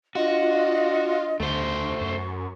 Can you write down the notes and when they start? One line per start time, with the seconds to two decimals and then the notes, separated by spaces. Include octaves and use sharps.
0.15 D4 F4 F#4 D#5
1.40 D2 A3 C5 C#6
2.01 F#2